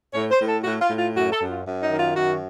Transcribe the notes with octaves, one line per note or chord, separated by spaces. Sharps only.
A2 C#5
C5
A2
A4
A2 F#4
F4
A2
F4
F#2 F#4
A4
F#2
F4
F#2
D#4
D#3
F4
F#2 F#4